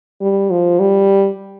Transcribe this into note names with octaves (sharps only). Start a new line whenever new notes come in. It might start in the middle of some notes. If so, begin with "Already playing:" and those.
G3
F3
G3